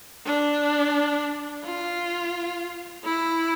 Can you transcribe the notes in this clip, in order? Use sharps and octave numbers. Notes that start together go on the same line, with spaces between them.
D4
F4
E4